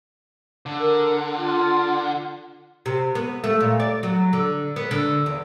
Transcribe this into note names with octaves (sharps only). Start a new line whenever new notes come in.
D3
A#4
F4
C3
B3
A3
A#2
D5
F#3
D3
B3
D3
E2